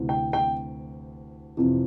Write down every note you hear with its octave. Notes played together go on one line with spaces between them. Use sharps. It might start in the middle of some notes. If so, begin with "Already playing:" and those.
Already playing: D2 C3 E3
G5
G5
F2 C3 E3